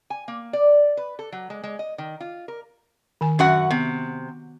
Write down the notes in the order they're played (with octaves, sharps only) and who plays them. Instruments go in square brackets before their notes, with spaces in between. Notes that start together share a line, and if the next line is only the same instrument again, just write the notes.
[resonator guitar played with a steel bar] G#5
A#3
D5
B4
A4
F#3
G#3
G#3
D#5
D#3
F4
A#4
[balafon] D#3 G#5
[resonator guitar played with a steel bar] F#2 F#4 F#5
[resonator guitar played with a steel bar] C3 [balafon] B3